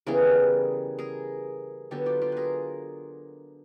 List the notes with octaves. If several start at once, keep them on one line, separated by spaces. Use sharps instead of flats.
C#3 E3 G3 B3 G#4 A#4
G#4 A#4
D3 F#3 B3 G4 A4
F4 G4
F4 G4
G#4 A#4 B4